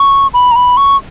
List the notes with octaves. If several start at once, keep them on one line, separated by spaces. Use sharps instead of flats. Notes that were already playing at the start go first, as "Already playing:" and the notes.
Already playing: C#6
B5
A#5
B5
C#6